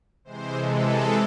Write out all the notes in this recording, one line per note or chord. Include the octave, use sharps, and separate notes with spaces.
C3 E3 G#3 C5
A4